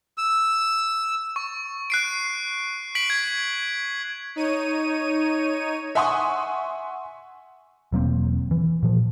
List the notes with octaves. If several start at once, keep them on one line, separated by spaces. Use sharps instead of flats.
E6
C#6
F#6 C7 D7
B6 D7 F#7
G#6
D#4 C#5 D#7
E5 F#5 G#5 C6 C#6 D#6
E1 F#3 A#3 C4
E3
A#2 F3